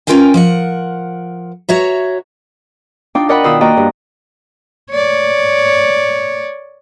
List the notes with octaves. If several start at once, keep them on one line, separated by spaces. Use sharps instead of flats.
C#4 E4 F4 A#4 G5 G#5
F3 A#4 F#5
F#4 C#5 E5 A#5
D4 D#4 F4 G5 D6
A#4 D5 D#5 F#5 G5 B5
B2 D#3 F4 D#6 E6
A#3 F#4 D5 D#5 G5 A#5
G2
C#5 D5